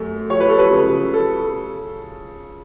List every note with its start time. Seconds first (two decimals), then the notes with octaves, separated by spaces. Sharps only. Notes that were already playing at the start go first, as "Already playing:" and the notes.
Already playing: F#2 A3
0.30 F3 C#5
0.40 B4
0.50 A4
0.59 B4
0.71 C#3
1.14 A4